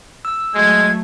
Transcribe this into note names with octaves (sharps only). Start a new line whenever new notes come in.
E6
F#3 G#3 A3 G#6